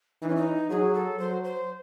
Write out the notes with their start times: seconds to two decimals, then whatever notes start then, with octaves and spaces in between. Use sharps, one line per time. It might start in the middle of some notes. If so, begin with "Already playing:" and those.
0.22 E3 D#4
0.29 C#4
0.36 D#4
0.70 F#3 G#4
0.95 A4
1.19 F#3 C5
1.44 C5